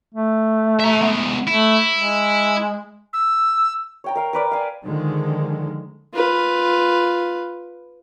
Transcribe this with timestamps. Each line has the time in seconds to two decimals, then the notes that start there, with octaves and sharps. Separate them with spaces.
0.15 A3
0.80 E5 A#5
1.01 G#3 B3
1.47 A3 E4
1.95 G#3
3.13 E6
4.04 C#5 G5 A#5
4.15 A#4 F5
4.33 A#4 B4 D5
4.51 F5 G#5
4.85 D3 D#3 F3 G#3
6.14 F4 B4